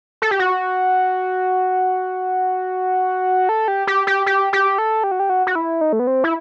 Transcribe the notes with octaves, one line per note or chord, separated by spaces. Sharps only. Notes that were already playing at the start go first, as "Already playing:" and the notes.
A4
G4
F#4
A4
G4
G4
G4
G4
G4
A4
G4
F#4
G4
F#4
F#4
E4
D#4
A3
B3
C4
E4